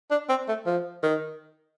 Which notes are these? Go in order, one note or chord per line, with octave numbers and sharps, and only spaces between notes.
D4
C4
A3
F3
D#3